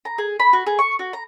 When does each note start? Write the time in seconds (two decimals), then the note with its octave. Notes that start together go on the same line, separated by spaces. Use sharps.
0.05 A#5
0.18 G#4
0.40 B5
0.53 F#4
0.66 G#4
0.79 C#6
0.99 F#4
1.13 A#5